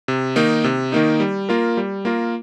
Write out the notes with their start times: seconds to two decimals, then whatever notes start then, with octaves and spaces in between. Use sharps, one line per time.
0.08 C3
0.36 D#3 A#3 D#4
0.64 C3
0.92 D#3 A#3 D#4
1.20 G3
1.49 A#3 F4 A#4
1.77 G3
2.05 A#3 F4 A#4